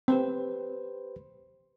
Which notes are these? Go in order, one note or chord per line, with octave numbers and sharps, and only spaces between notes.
C4 G4 B4 C5